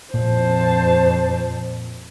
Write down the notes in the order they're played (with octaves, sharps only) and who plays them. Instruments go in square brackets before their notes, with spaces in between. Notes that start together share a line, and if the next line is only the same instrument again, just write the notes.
[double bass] F2 [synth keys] A#2 [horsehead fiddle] C5 A5